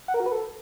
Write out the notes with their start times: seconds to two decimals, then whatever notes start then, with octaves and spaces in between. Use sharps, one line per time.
0.08 F#5
0.14 A#4
0.20 F#4
0.26 B4
0.32 A4